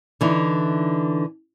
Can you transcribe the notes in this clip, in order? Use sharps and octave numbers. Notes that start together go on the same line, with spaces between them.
D3 E3 D#4